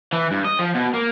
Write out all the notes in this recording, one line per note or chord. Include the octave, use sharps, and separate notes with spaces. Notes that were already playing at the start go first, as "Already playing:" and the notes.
E3
G2
D#5
F3
B2
A#3